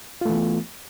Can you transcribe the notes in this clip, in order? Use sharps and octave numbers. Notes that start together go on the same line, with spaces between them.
E3 A3 B3 F4